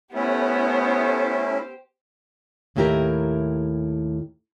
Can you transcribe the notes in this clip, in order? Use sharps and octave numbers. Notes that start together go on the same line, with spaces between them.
A3 B3 C#4 E4 G4 C5
D#2 A2 E4 G4 A#4 A#5